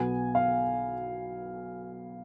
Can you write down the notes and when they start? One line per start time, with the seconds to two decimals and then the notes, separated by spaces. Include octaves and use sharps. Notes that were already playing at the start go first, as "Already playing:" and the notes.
Already playing: B1 B2 B3 G#5
0.35 F5